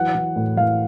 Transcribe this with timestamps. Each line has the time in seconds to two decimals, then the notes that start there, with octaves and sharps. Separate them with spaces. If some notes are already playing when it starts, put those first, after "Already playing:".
Already playing: E3 F#3 F#5
0.15 E3
0.36 A2
0.57 E3 F5